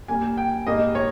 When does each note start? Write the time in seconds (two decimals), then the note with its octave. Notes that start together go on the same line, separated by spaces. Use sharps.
0.08 A#2 G3 A#3 G#5
0.38 G5
0.67 G#2 G3 A#3 D#5
0.95 C#5